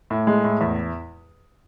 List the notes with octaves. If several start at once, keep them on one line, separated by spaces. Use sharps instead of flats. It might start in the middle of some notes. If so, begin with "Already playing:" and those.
A2
G#3
A2
E2